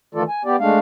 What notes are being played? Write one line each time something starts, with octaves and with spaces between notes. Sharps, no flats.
D#3 E3 A3 F4 A4 D5
G#5
B3 G4 D5
G#3 A3 D4 F5